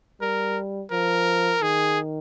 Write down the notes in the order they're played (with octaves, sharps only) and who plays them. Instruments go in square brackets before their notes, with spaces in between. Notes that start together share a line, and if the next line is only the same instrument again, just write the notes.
[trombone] G3 [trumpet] A#4
[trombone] F3 [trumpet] A#4
[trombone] D#3 [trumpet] G#4